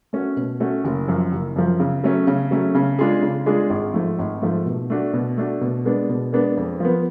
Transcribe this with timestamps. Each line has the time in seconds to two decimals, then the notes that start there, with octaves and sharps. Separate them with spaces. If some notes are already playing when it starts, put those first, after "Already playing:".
0.13 A3 C#4 F#4
0.37 B2
0.60 A3 C#4 F#4
0.84 F#1
1.08 F#2 F3
1.32 F#1
1.56 F#2 F3
1.80 C#3
2.03 F#3 A3 C#4
2.27 C#3
2.51 F#3 A3 C#4
2.75 C#3
2.99 G#3 D4 F4 G#4
3.22 C#3
3.46 G#3 D4 F4 G#4
3.70 G#1
3.94 G#2 F3 A3
4.19 G#1
4.42 G#2 F3 A3
4.66 B2
4.90 A3 D4 F#4
5.13 B2
5.38 A3 D4 F#4
5.61 B2
5.85 G#3 B3 D4
6.09 B2
6.33 G#3 B3 D4
6.57 F2
6.80 F3 B3